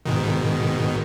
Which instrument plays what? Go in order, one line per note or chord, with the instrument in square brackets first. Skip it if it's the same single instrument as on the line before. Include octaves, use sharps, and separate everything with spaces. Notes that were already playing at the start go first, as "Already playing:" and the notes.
[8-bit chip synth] G#2 B2 D#3